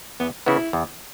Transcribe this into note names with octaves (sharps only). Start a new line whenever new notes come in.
E2 B3
C#3 E3 B3 E4
E2